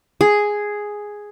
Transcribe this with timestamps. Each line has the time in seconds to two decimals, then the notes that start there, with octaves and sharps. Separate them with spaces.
0.21 G#4